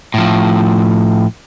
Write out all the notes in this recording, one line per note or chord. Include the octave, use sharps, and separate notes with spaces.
A2 F3